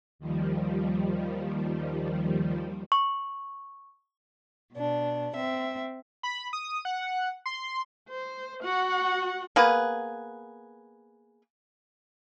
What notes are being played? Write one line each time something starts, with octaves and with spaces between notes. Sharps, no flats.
D#2 D#3 F3 G3
C#6
B2 D4
C4 E5
B5
D#6
F#5
C6
C5
F#4 F#5
A#3 B3 G#4 B4